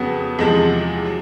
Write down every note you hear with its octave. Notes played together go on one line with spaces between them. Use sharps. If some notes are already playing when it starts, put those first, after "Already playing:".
Already playing: F2 C#3 F#3 B3
E2 C3 F3 G#3
F#3